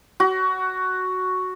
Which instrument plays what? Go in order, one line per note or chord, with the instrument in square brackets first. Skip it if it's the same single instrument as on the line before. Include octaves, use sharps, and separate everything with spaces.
[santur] F#4